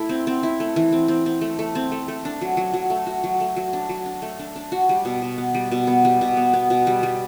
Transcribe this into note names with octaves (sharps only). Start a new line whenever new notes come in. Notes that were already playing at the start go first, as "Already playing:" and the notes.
Already playing: A3 E4
C4
C4
E4
A3
E3
C4
C4
C4
A3
A3
C4
A3
A3
D4
F#3
F#3
F#3
A3
F#4
F#3
A3
F#3
D4
F#3
D4
A3
D4
D4
F#4
G3
B2
B2
B3
G3
B2
B3
G3
B2
B3
B3
B2
G3
G3